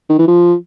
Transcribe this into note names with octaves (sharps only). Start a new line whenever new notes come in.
D#3
E3
F3